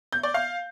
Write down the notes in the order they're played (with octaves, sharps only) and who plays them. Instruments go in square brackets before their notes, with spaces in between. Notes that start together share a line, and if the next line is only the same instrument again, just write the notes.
[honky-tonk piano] G6
D5
F5